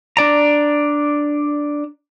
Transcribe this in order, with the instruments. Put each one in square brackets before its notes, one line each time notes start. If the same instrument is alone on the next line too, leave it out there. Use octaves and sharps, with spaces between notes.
[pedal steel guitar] D4 D5 A#5